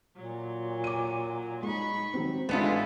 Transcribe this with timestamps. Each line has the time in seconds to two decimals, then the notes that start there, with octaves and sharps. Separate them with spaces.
0.16 A#2 F#3
0.84 D6 D#7
1.63 G#3 D#4 B5 C#6
2.14 D#3 F#3 C4
2.49 A1 G#3 B3 D4 E4 F4 A4 C#7